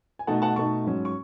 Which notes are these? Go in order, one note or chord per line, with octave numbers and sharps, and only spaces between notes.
G#5
B2 A3 D#4 F#5 A5
F#5 A5
B2 A3 D#4 A5 C#6
G#2 F#3 C#4
C#6